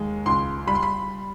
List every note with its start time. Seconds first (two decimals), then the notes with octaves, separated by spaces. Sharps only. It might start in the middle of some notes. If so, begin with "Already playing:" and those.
Already playing: D#2 G#3
0.26 C#2 C6
0.67 G3 B5
0.75 C6
0.83 B5